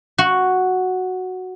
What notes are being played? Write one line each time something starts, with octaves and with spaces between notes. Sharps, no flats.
F#4